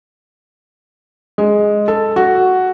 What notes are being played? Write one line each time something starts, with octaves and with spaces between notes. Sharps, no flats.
G#3
A4
F#4